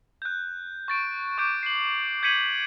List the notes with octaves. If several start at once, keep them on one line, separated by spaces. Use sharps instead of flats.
F#6 G6
C#6 A6 D7
C#6 D6 G6 D7
C7 F#7
G6 G#6 B6 C#7 D#7 F#7